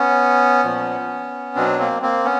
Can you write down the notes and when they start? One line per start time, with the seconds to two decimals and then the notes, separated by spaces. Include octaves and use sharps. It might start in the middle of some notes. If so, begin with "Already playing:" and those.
Already playing: B3 C#4
0.64 A#2 F3
1.56 B2 F#3 C4 D4
1.79 A#3 C4
2.02 A#3 C4
2.25 B3 C#4